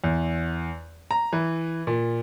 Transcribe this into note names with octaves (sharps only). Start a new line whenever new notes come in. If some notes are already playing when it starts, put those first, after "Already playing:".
E2
A#5
E3
A#2